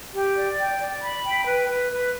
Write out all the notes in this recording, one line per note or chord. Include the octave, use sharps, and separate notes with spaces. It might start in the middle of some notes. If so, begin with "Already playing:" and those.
G4
D5
G5
D5
B5
G5
B4
B4
B4